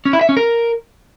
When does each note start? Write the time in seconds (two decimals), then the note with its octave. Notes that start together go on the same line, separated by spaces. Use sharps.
0.05 C#4
0.13 E4
0.21 E5
0.29 C#4
0.37 A#4